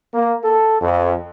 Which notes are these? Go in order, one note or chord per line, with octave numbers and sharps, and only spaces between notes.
A#3
A4
F2